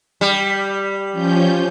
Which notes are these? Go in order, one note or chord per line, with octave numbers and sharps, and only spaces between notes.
G3
F3 C#4 G6